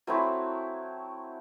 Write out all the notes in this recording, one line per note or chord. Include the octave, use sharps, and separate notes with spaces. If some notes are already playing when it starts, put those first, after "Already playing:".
F#3 A3 C4 E4